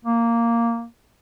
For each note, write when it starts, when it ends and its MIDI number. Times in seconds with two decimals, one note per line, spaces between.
0.05 0.85 58